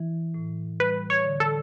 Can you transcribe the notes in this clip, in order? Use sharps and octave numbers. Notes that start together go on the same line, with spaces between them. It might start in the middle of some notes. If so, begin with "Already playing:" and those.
Already playing: E3 E4
A2
G3 B4
C#5
D3
A4